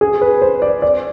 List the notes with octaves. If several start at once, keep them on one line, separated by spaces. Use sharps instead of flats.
G#4
B4
C5
D5
D5